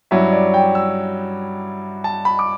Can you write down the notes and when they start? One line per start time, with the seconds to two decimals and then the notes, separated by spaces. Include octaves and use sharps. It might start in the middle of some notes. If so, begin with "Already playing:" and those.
0.11 G2 F#3 C#4 E4 E5
0.33 D5
0.54 G5
0.75 E6
2.04 A5
2.25 B5
2.39 D6